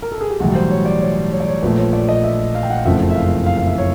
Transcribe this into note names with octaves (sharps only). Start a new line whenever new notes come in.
A#4
A4
G#4
G4
B1 A2 E3 G3 F#4
C5
C#5
D5
C#5
C#5
D5
C#5
A#1 A#2 F3 A3 B4
C#5
D5
D#5
E5
F5
G5
F#5
F5
F#1 F2 C#3 F3 A3 E5
E5
F5
F5
F5
E5
C#5